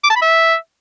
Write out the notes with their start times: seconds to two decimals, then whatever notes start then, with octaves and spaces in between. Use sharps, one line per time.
0.04 D6
0.10 A5
0.16 B5
0.22 E5